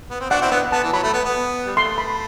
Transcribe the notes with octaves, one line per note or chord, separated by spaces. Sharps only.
B3
C4
D4 F#4 F#5
C4 E4
B3 D4 F#5
B3 A5
E3
F#3 B5
A3
B3
B3
G3
A3 C6
B5